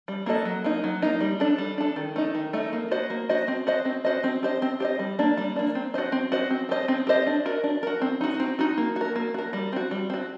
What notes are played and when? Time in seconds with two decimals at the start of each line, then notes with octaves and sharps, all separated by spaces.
0.08 G3
0.26 A#3 F#4 A4 D#5
0.45 F#3
0.64 A#3 D#4
0.84 F#3
1.02 A#3 D#4
1.20 G3
1.40 D4 A4
1.58 G3
1.78 D4 A4
1.96 D#3
2.16 A3 D#4
2.35 D#3
2.53 A3 D#4
2.73 A#3
2.91 F#4 C5 D#5
3.10 A#3
3.29 F#4 C5 D#5
3.48 C4
3.67 F#4 C5 D#5
3.85 C4
4.05 F#4 C5 D#5
4.24 C4
4.43 G4 C5 D#5
4.62 C4
4.80 G4 C5 D#5
4.99 G3
5.19 A#3 D4
5.37 G3
5.56 A#3 D4
5.75 C4
5.94 F#4 C5 D#5
6.12 C4
6.32 F#4 C5 D#5
6.50 C4
6.69 G4 C5 D#5
6.88 C4
7.07 G4 C5 D#5
7.27 D4
7.45 F#4 A#4
7.64 D4
7.83 F#4 A#4
8.02 C4
8.21 D#4 F#4
8.40 C4
8.59 D#4 F#4
8.78 A#3
8.96 F#4 A#4
9.16 A#3
9.34 F#4 A#4
9.53 G3
9.73 C4 F#4
9.91 G3
10.10 C4 F#4